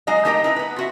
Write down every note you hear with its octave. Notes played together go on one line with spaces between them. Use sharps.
F#3 G#3 D#4 D#5 F5
A3 D#4 G4 A#4 D#5 G5
D#4 E4 B4
B3 B4
F4 F#4 E5